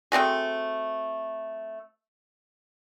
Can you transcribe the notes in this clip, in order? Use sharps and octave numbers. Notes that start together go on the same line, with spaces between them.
A3 C4 F#4 G#4